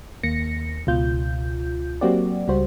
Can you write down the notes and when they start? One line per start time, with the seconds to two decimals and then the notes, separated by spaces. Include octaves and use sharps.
0.23 D#2 A#3 A#6 C#7
0.87 C#2 B2 F4 G6
2.01 F#3 A#3 C4 F#4 G4 D5
2.48 C#2 G3 F#4 C5